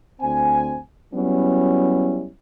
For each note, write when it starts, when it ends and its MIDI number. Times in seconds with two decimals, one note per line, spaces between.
0.20 0.77 38
0.20 0.77 60
0.20 0.77 80
1.13 2.27 54
1.13 2.27 55
1.13 2.27 59
1.13 2.27 61
1.13 2.27 64